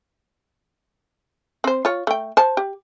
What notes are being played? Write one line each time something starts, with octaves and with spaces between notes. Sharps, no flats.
C4 C5
F4 C#5
A3 G5
C5 A5
G4